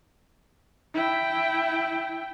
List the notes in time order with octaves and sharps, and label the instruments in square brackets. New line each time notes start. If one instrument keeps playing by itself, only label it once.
[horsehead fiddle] E4 G5